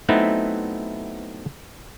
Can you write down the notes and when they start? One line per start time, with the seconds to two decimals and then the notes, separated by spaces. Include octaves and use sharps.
0.09 F#3 A3 B3 C4 D#4 E4